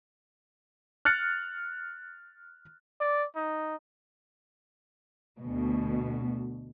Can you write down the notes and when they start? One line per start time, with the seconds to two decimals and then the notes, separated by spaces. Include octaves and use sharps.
1.05 F6 F#6 A6 C#7
3.00 D5
3.36 D#4
5.41 D2 B2